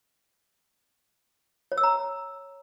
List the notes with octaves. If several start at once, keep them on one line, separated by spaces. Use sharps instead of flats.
C#5
E6
A#5